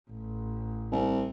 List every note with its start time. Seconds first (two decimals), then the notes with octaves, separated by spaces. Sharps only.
0.11 A1
0.92 C2